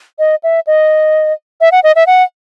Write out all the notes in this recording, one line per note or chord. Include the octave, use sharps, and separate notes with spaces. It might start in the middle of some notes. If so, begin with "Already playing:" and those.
D#5
E5
D#5
E5
F#5
D#5
E5
F#5